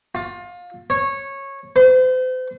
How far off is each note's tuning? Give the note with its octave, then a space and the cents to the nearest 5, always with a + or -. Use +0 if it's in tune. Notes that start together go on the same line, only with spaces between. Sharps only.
F4 +25
C#5 -15
C5 -40